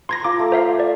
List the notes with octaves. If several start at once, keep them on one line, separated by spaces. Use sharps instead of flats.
A#5 C6 G#6 A#6
F4 A#5 D6
A3
C5 E5 F5
D5